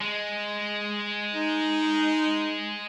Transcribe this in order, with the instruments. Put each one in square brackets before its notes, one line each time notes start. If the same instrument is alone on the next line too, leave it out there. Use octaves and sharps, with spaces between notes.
[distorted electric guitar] G#3
[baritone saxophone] D#4